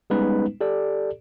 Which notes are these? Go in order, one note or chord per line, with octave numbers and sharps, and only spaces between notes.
G3 G#3 B3 C#4 D#4 B4
G4 A4 D5